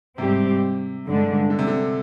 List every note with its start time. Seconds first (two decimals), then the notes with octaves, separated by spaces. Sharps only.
0.18 G#2 C3 G3 C4 G4
1.06 G2 D3 G#3 D4
1.50 D3
1.59 C3
1.67 D3